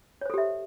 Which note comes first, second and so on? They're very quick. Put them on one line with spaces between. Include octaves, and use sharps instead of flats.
C#5 C5 A4 G4 E5